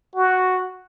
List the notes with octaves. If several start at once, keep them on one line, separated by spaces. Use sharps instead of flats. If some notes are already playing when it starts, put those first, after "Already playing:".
F#4